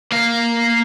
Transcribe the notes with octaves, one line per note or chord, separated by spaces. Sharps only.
A#3 F5